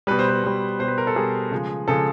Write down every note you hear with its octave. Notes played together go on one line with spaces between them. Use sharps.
B2 G3 B4
C5
B4
B2 G3
B2 G3 B4 C5
A#4
A4
B2 G3 G#4
C#3 F3 G#3
C#3 F3 G#3 A4